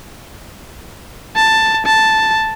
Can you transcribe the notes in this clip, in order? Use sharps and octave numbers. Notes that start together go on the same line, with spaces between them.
A5
A5